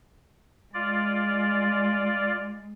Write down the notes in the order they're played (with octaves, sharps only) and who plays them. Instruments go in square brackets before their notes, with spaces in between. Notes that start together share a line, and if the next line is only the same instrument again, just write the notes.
[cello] G#3 [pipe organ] F4 D5